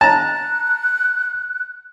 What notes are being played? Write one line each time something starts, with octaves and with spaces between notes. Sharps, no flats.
A5 A#5 F#6